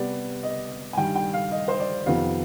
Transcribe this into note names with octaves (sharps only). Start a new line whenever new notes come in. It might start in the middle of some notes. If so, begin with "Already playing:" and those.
Already playing: C3 G3 B3 D5
D#5
G#5
G2 D#3 G3 G5
G5
F5
D#5
C5
D5
F2 C3 D#3 B3 F5